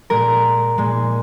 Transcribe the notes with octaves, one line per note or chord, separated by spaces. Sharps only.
A#2 G#3 A#4
A#2 G#3